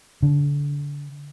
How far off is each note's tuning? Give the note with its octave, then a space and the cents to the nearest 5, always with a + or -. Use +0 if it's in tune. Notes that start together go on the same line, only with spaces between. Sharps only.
D3 -30